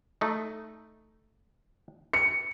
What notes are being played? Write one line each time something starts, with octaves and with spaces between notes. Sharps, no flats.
A3 D#4
C#7